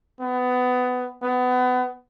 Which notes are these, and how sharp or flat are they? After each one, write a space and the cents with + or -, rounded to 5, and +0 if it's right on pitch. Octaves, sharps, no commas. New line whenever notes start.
B3 +20
B3 +25